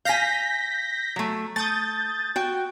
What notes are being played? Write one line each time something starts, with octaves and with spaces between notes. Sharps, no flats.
F5 G#5 G6 A#6 B6
F#3 A3
A3 D#6 G6 A6
F#4 G5